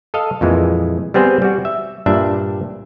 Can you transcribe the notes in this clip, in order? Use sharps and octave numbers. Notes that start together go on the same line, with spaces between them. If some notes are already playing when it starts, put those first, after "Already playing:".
A4 D#5 F5
F2 A#2 E3 G#3
G3 B3 C4 G#4 C5
G3 F#4
E5
G2 A#2 D4 E5